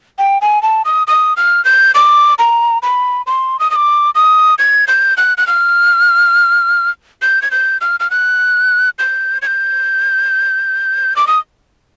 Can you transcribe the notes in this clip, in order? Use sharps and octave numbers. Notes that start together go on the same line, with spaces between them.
G5
G#5
A5
D#6
D#6
F6
G6
D6
A#5
B5
C6
D#6
D#6
D6
D#6
G#6
G6
F#6
F#6
F6
G6
G#6
G6
F6
F6
F#6
G6
G#6
G6
D6
D#6